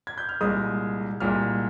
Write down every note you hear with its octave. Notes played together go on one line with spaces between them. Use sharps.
G#6
G6
F6
C2 A#2 G#3 D#6
C2 A#2 G#3 F6